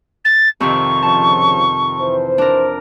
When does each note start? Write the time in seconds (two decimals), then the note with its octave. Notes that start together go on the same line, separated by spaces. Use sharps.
0.25 A6
0.60 F2 C3 D#3 C#6
1.02 C#3 F3 A5
2.01 E3 C5
2.38 D4 A#4